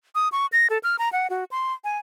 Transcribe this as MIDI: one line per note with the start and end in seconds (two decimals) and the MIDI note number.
0.15 0.29 87
0.32 0.46 85
0.53 0.67 94
0.70 0.78 69
0.83 0.96 89
0.99 1.11 82
1.12 1.27 78
1.30 1.44 66
1.51 1.73 84
1.84 1.98 80